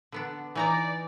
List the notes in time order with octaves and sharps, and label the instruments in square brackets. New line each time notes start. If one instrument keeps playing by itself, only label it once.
[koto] D3 B3 D4
[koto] E3 D#4 A#5 [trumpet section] D5